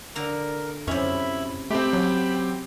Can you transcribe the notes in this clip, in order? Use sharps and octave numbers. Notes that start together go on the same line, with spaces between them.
D3 A#4 F5
F#2 C3 C#4 E4 B5
A3 C4 G4 G5 B5
F#3